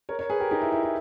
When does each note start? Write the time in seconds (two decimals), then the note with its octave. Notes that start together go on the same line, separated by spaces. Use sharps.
0.09 A#4 C#5
0.19 A#4 C#5
0.30 G#4 B4
0.40 G4 A#4
0.51 D#4 G4
0.62 E4
0.72 E4
0.83 E4